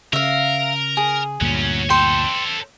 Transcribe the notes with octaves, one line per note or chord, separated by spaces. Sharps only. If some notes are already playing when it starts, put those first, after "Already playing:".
C#3 A#4 E5 F5
G#4
D2 G2 A#2 F#3 C#4
A4 C5 G5 C6